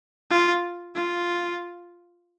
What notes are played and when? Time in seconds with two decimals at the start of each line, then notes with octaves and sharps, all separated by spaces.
0.31 F4
0.96 F4